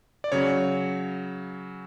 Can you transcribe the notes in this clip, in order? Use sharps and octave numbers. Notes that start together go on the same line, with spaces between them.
D5
C#3 F#3 C#5